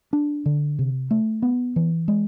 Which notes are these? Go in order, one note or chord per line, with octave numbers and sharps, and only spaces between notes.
D4
D3
C3
A3
B3
E3
G#3